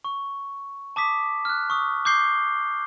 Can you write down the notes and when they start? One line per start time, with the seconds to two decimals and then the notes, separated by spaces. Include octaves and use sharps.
0.05 C#6
0.96 A5 D6 D#6 B6
1.45 F6 F#6
1.70 C#6 D#6
2.05 D6 G6 C7 G7